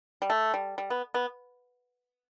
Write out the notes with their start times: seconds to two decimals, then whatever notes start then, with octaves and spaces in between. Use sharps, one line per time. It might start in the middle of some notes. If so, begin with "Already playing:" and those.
0.22 G3
0.30 A3
0.54 G3
0.78 G3
0.90 B3
1.14 B3